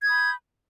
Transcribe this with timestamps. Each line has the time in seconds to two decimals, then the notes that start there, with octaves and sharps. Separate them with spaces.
0.01 G#6
0.05 D#6
0.09 B5
0.13 G6